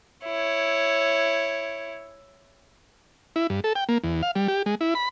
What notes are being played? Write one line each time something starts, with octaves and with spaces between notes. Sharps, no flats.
E4 C#5
E4
G2
A4
G5
A#3
E2
F5
G3
G4
G#3
E4
B5